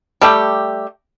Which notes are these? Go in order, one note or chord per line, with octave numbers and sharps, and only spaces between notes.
G3 A3 G4